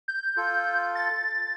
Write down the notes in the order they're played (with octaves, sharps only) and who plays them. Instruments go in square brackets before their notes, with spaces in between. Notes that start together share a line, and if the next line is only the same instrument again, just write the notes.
[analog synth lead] G6
[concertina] F4 A4
[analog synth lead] A6